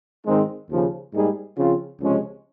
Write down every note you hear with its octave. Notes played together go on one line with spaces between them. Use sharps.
G#2 D#3 G#3 C4 D#4
D#2 C#3 F3
G#2 G3 A#3 D#4 G#4
C#3 F3 C4 F4
C#2 C3 F3 G#3 C#4